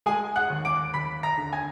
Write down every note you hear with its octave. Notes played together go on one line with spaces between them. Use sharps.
G#3 G#4 G#5
F#5 F#6
D#2
D6 D7
D#2 B5 B6
A#5 A#6
D3
G#5 G#6